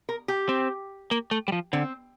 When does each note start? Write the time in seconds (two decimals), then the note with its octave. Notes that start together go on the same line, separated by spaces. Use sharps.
0.09 A#4
0.28 G4
0.49 C4
1.11 A#3
1.31 A3
1.48 G3
1.52 F3
1.73 D3 C4